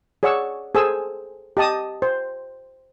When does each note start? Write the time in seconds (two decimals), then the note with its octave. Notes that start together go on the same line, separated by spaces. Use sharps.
0.23 G#4 C#5 D5 F#5 C#6 E6
0.75 G#4 A4 C5 G#5 E6
1.57 G4 D#5 A5 D#6
2.02 C5